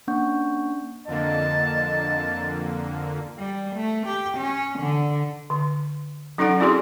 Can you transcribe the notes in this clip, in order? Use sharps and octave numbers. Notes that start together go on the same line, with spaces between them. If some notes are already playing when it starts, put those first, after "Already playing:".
A#3 C#4 D4 F#5 C#6 G6
F2 D3 A#3 D#5 A5
G3
A3
G4
C#4
D3
D3
F#3 C#4 D#4 A4 D5 F#5
C4 E4 F#4 G#4 D5 C6